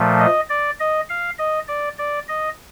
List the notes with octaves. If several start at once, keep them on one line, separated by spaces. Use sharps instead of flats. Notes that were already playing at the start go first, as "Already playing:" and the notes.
Already playing: A#2 F3 A3
D#5
D5
D#5
F5
D#5
D5
D5
D#5